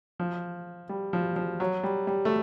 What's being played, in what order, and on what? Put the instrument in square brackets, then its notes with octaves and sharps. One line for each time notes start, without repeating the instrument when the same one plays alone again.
[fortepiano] F3
G3
F3
F3
F#3
G3
G3
A3